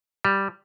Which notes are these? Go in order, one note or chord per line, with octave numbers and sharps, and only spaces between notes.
G3